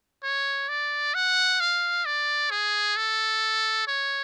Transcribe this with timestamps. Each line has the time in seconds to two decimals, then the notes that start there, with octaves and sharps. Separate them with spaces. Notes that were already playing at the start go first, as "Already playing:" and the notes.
0.23 C#5
0.68 D5
1.14 F#5
1.60 F5
2.05 D5
2.51 G#4
2.96 A4
3.87 C#5